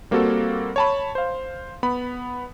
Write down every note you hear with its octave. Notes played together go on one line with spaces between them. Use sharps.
G3 A#3 C4 F#4 A4
C#5 A5 B5
C5 F5
B3 B5